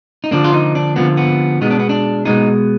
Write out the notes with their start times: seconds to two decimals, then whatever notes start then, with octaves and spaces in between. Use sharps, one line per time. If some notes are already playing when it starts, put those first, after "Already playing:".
0.24 D#4
0.31 D3 F3 A#3 D4
0.44 F4
0.53 D#4
0.75 D4
0.96 D3 F3 A#3 B3
1.17 B3
1.61 B2 G#3 B3 D#4
1.71 D4
1.79 B3
1.89 D4
2.25 B2 G#3 B3 D#4